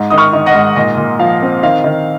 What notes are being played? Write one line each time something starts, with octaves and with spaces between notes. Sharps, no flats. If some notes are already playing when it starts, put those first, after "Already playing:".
Already playing: G#2
D#3 D#6
C#6 F6
D#3
D#5 F#5
G#2
A#2 D#5
A#2
F3 F5
C4
D#3 F5
D#3